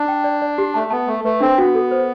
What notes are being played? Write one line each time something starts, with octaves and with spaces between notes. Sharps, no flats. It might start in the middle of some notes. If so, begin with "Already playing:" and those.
Already playing: D4
G5
D5
D5
G4
A3 A5
B3 A5
A3 A5
A3 B4
C4 D4
B3 F#4
A4
C5